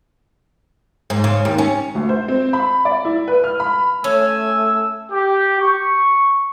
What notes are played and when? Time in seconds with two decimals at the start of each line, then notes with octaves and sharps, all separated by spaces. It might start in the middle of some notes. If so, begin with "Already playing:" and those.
1.10 G#2
1.24 C#3
1.45 D#2
1.58 C#4
1.95 D2
2.09 C5
2.28 C4
2.53 B5
2.85 D5
3.05 E4
3.27 B4
3.44 F6
3.60 B5
4.04 A3 C#4 G#5 E6
5.11 G4
5.59 C#6